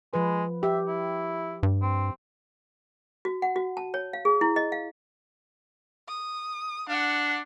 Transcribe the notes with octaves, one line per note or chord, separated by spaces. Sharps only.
F3 G#3 B4
G4 E5
E4
G2
C4
F#4
F#5
F#4
A5
C#5
F5
G#4
E4
D#5
F5
D#6
D4 F#5